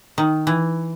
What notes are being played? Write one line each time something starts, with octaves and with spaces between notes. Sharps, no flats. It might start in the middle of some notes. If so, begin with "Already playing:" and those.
D#3
E3